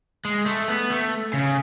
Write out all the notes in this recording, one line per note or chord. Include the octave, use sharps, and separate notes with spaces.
G#3
A3
B3
A3
C#3